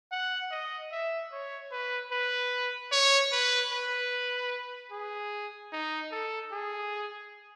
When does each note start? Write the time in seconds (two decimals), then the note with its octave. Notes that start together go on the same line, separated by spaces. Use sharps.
0.12 F#5
0.51 D#5
0.92 E5
1.32 C#5
1.71 B4
2.12 B4
2.92 C#5
3.32 B4
3.72 B4
4.91 G#4
5.72 D#4
6.12 A4
6.52 G#4